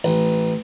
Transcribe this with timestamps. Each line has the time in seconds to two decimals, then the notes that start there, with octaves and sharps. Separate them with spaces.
0.04 A1